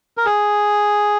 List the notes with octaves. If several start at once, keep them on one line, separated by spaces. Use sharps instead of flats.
A#4
G#4